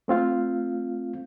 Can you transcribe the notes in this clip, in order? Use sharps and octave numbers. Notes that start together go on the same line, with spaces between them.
A3 C4 F4 F5